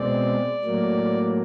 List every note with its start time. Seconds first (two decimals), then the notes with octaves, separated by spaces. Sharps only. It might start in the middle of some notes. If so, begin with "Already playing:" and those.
Already playing: B2 G#3 C4 D5
0.64 A2 F#3 A#3